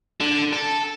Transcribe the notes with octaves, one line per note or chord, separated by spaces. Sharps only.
D3
A4